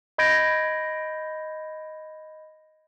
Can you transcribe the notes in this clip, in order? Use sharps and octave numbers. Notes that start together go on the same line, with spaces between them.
D#5 B5 G6 G#6 A#6 D7